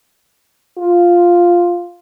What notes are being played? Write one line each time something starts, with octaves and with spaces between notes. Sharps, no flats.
F4